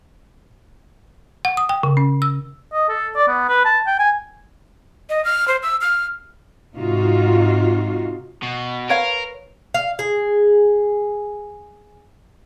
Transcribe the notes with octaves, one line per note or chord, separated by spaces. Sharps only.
F#5
D#6
G5
C#3
C#4
E6
D#5
A4
D5
B3
B4
A5
G5
G#5
D#5
F6
C5
E6
F6
G#2 C3 D#4 F4 F#4
B2
A#4 B4 C#5 F5
F5
G#4